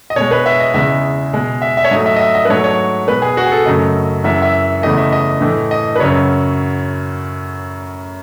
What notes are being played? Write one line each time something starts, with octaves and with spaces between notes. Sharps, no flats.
D#5
B2 G#3 C#5
B4
E5
D#5
E2 C#3 G#3 E5
B2 G#3
E5
E5
C#5
G#2 F#3 A3 D#5
E5
D#5
E5
D#5
B4
G#2 F#3 A3 C#5
C#5
B2 G#3 B4
G#4
F#4
G#4
A4
F#2 C#3 F#3 A3 D#5
F#2 E3 G#3 E5
E5
E2 C#3 E3 A3 D#5
E5
D#5
A2 E3 A3
D#5
B4
F#2 C#3 F#3 C#5